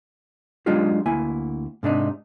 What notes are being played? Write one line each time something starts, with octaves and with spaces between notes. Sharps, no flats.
F#3 G#3 D4 D#4 F4 G4
D2 A#3 E4 G#5
G#2 C3 D4 D#4